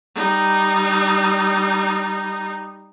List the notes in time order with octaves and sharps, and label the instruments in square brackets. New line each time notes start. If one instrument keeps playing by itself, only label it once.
[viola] G3 D#4